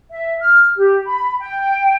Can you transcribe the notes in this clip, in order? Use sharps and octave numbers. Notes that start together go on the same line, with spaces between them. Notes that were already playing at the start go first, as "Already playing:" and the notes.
E5
F6
G4
B5
G5